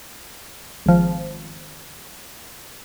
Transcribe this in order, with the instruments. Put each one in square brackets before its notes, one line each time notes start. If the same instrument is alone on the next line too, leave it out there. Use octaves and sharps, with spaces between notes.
[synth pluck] G#1 F3